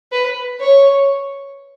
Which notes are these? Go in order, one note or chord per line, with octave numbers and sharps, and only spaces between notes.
B4
C#5